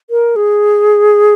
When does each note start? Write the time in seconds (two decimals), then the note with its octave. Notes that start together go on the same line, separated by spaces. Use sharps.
0.10 A#4
0.36 G#4